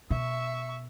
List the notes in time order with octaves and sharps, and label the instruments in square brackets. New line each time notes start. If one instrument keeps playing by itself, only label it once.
[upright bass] B2 [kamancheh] E5 C#6